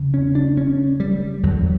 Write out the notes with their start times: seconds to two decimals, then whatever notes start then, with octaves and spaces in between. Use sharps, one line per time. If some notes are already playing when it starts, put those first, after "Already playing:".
Already playing: E2 C#3
0.14 C#4
0.35 D4
0.57 C#4
1.00 G3
1.43 E2 D3 F#3